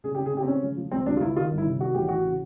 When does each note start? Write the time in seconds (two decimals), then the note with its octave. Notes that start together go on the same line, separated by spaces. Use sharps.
0.04 C#3 G#4
0.15 G4
0.18 C#3
0.26 G#4
0.33 C#3 G4
0.43 C4
0.48 C#3 C#4
0.63 F3
0.77 F3
0.91 C#2 C4
1.06 C#2 D4
1.17 F4
1.21 C#2 E4
1.36 D#3 F4
1.51 G1
1.58 E4
1.66 C3
1.80 D#3 F#4
1.95 A1 G4
2.08 A1 F#4
2.24 C#3